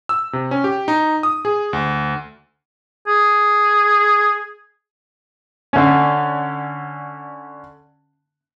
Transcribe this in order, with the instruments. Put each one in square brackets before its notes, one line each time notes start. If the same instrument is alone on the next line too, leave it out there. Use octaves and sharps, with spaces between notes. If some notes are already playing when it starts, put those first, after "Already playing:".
[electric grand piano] E6
C3
C#4
G4
D#4
D#6
G#4
D2
[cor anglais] G#4
[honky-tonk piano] D3 C#4